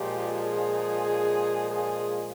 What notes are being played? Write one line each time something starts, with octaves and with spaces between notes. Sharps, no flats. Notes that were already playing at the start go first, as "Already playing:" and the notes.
Already playing: A#2 F3 G#3 G4
G#4
G#4